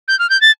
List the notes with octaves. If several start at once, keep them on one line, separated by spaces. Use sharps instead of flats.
G6
F6
G6
A6